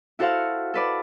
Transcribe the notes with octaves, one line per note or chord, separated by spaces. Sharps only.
E4 F#4 A4 C5 F5 F#5
A4 B4 D5